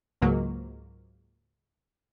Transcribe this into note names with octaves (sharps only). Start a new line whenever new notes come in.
C#2 G#2 F#3 A#3